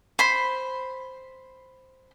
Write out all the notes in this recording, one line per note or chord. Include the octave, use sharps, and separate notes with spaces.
C5 B5